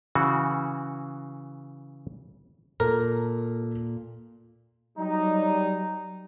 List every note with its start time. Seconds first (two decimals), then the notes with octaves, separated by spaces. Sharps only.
0.15 C#3 E3 F#4
2.80 A#2 A4 A#4
4.98 F#3 G3 D#4